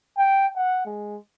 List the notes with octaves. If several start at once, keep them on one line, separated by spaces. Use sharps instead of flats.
G5
F#5
G#3